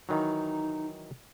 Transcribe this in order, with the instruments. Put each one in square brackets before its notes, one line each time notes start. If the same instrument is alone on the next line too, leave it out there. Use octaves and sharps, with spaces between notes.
[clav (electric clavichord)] D#3 E3 F#3 [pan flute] D#4